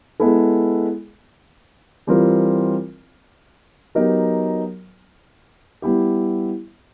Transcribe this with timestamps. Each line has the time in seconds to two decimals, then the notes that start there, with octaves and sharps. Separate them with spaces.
0.20 G#3 B3 E4 A4
2.07 E3 G3 C4 F4 A#4
3.95 F#3 B3 D#4 G4 A#4
5.82 G3 B3 E4 G4